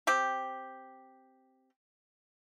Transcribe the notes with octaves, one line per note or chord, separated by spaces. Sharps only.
C4 G4